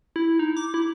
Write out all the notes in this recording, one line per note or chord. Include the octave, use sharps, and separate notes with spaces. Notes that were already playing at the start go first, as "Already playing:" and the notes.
E4
D#4
D6
E4